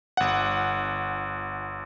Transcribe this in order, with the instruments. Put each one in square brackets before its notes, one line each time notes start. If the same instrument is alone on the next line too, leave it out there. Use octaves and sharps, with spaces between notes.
[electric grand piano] G1 F#5